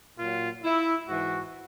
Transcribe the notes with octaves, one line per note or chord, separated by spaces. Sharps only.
A#2 F#3 F4
E4
G#2 E3 F#4